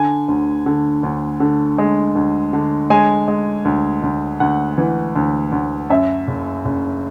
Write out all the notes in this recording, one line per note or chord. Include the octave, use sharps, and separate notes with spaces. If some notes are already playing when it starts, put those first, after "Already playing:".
Already playing: D3 G#5
D2
D3
D2
D3
G#3
D2
D3
G#3 G#5
G#3
D2
D2
D2 F#5
E3
D2
D2
F#2 E5
F#1
F#1